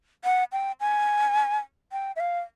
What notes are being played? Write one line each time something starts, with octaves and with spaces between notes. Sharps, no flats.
F#5
G5
G#5
G5
E5
F5